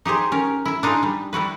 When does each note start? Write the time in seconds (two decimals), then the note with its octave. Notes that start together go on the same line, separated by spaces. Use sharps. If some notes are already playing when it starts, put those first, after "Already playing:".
0.05 D#4 G4 G#4 C5
0.32 C#4 A#4
0.65 E4 E5
0.83 D4 D#4 F4 G#4
1.03 G3
1.33 G3 E4 F#4 B4